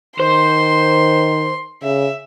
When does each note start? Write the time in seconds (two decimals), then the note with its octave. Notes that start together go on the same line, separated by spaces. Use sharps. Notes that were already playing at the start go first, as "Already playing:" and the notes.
0.20 D#3 C5 C6
1.83 C#3 E5